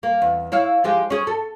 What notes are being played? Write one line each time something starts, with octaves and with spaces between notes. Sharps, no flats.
A#3
E2
E4 C#5 F5
F3 G#3 G4
C#4 G#4
A4